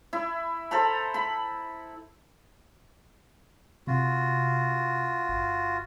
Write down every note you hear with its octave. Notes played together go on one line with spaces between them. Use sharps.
E4
A4 C5 A#5 B5
B5
C3 F4 F#4
G1